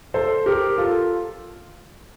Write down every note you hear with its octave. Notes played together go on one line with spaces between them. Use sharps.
A4 C5
G4 A#4
F4 A4